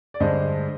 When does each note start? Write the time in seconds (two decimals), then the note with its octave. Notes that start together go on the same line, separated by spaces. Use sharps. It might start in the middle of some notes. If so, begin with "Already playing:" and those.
0.14 D5
0.20 G2 D3 G#3 C5 D#5